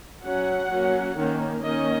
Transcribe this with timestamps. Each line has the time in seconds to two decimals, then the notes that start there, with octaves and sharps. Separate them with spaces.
0.24 F#3 C#4 F#5
0.71 F#3 A#3 C#4
1.17 D#3 A#3 C#4
1.63 D#3 A#3 C#4 D#5